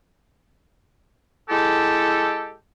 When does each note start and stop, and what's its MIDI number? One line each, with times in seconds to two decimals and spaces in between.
1.49 2.53 56
1.49 2.53 64
1.49 2.53 67
1.49 2.53 69